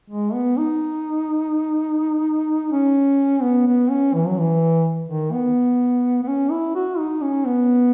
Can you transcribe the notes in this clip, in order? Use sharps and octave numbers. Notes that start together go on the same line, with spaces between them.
G#3
B3
D#4
C#4
B3
B3
C#4
E3
F#3
E3
D#3
B3
B3
C#4
E4
F#4
D#4
C#4
B3